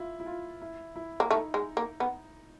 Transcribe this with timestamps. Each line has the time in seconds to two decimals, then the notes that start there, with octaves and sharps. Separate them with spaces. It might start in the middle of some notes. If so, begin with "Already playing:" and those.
Already playing: E4 F4
0.20 E4
0.26 F4
0.62 E4
0.96 E4
1.20 A#3
1.31 A3 D#4
1.54 G#3
1.77 A#3
2.00 B3